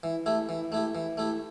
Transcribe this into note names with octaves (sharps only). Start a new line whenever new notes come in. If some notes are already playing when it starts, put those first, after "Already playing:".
E3
A3 E4 G4
E3
A3 E4 G4
E3
A3 E4 G4